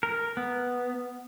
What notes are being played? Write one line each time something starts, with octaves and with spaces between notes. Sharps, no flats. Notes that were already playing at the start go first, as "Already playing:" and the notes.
A#4
B3